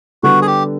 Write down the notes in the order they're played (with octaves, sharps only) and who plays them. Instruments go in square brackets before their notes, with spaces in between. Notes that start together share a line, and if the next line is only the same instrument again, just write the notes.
[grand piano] D3 G3 B3 [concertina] F#4
[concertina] G#4
G4